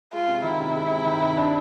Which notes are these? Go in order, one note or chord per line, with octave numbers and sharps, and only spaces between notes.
G#3 F4
C3
D#3 E4
C3
G#3
C3
D#3
C3
D4